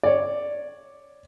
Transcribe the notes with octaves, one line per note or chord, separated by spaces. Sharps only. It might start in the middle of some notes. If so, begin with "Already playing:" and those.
C#5 D5